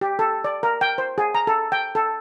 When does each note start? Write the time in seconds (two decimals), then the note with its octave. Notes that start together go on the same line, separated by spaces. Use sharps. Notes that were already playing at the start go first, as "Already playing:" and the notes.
0.01 G4
0.19 A4
0.44 D5
0.63 A#4
0.81 G5
0.98 C5
1.18 G#4
1.35 A#5
1.47 A4
1.72 G5
1.95 A4